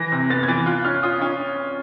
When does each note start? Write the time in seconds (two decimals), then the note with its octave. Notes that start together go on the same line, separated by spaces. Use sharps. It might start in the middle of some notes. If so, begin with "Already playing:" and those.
Already playing: E3 A#6
0.12 C3
0.30 B3 A6
0.43 G#6
0.48 E3 A6
0.66 F4 F#6
0.85 C#4 F6
1.03 F4 D#6
1.21 C#4